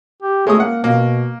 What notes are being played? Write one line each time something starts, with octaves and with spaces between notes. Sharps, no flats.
G4
G#3 A3 C#5 D#6
A#3 F#5
B2 A#3